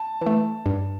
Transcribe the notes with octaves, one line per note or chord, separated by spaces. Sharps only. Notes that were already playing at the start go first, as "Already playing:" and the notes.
Already playing: A5
E3
A3
G2